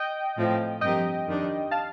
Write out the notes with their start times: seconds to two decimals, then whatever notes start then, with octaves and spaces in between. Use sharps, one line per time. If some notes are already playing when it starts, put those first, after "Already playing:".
Already playing: D#5 G5
0.37 A2 F3 C4
0.81 G2 F3 C4 G4 A#4 D#5 G5
1.27 F2 D#3 G3 D4
1.71 F5 A5